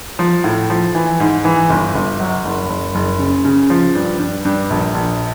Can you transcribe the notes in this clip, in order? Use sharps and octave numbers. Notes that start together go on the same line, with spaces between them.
F3
A2
F3
E3
G#2
E3
G1
G1
F#3
F#1
F#1
F#1
C#3
C#3
F3
G2
G2
G2
A#1
A#1